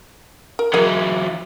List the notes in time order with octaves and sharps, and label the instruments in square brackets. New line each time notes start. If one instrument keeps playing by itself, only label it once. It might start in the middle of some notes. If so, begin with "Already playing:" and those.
[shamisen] A#4
[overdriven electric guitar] E3 F#3 [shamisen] G#4 A#4 D#5